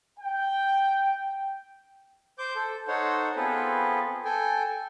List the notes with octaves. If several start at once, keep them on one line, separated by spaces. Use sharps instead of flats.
G5
C5 D6 G6
A4
D#4 A4 C5 C#5 F#5
B3 C4 F4 G#4 A4 B4
A4 G5 G#5